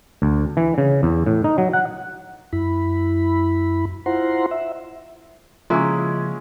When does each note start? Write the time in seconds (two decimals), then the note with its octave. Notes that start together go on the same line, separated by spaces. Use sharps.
0.22 D2
0.57 E3
0.78 C#3
1.03 E2
1.26 A2
1.44 D#4
1.58 F#3
1.73 F#5
2.53 F#2 E4 B5
4.06 E4 F4 C5 F#5 A#5 C6
4.51 E5
5.70 C#3 F3 G#3 A#3 C#4 E4 F4